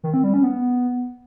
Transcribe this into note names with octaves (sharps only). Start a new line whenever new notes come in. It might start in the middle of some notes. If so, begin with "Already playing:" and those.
D#3
C4
G3
C#4
B3